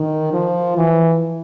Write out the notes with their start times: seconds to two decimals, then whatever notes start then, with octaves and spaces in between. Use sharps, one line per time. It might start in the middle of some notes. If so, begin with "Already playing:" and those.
Already playing: D#3
0.33 F3
0.77 E3